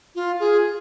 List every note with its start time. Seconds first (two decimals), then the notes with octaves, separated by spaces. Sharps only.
0.15 F4
0.40 G#4